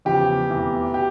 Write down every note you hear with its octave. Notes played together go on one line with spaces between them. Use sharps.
E2 C#3 F3 G4
F1 E2 E3
G4